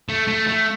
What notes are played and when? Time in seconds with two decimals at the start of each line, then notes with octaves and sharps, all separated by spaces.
0.09 A3
0.27 A3
0.48 A3